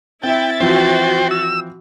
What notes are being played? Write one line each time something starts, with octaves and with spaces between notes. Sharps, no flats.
C4 E4 E5 G5 A6
E3 F3 C4 F#4 C5 G5
E6